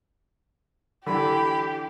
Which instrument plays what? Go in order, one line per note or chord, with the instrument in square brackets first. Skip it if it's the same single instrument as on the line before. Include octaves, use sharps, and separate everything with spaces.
[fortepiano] D3 E3 [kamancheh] G4 [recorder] B5